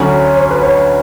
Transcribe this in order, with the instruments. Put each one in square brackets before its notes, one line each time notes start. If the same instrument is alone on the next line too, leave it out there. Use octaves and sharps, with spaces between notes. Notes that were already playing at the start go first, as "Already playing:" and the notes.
Already playing: [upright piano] D2 D3 F#3 C#4 [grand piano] C#5
[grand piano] C#5
B4
C#5